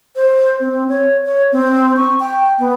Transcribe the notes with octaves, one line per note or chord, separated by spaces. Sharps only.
C5
C4
C#5
C#5
C4
C#6
G5
B3